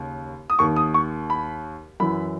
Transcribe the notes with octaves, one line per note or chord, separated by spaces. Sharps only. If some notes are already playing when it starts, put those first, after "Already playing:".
Already playing: D#2 C#3
D#6
D#2 D#3 C#6
D#6
C#6
B5
F#2 E3 B5